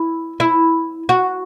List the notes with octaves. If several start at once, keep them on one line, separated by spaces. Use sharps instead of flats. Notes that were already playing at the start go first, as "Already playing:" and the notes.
Already playing: E4
E4
F#4